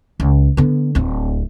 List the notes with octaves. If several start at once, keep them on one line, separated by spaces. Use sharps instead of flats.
C#2
D3 B3
D1 C4